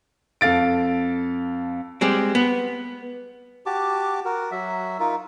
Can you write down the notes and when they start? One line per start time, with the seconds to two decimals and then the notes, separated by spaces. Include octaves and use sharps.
0.41 F2 A4 F5 A6 D7
2.01 G3 G#3 C4
2.35 B3
3.66 F#4 G4 A5 D6
4.25 F#4 A#4
4.51 F#3 E5
5.00 D#4 F4 A#4